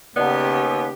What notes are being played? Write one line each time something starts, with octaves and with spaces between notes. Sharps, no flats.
D#2 C#3 B3 G4 D5 F#5 A5